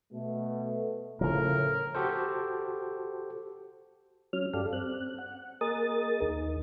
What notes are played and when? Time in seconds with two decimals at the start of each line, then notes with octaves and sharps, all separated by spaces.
0.14 B2 A3
1.21 A2 C#3 F3 A#4
1.95 F#4 G4 A4 C5
4.33 F#3 C#4 F6
4.54 G2 G4 A4 D5 F5
4.73 C4 F#6
5.18 F#5
5.61 A#3 G#4 A#4 D#5 D#6 A6
6.21 D#2 D#4